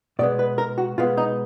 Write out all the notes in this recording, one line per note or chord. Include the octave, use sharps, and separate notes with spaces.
B2 G#3 B3 D5
B4
A#4
F#4
B2 G#3 B3 F4
D#4